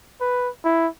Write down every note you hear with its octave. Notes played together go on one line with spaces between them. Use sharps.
B4
E4